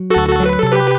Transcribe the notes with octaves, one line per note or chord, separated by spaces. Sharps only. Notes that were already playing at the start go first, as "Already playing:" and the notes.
Already playing: F#3
F#4 A4
D2
F#4 A4
F#3
B4
C3 A4
G4 B4